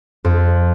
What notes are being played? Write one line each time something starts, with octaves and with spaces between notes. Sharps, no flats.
F2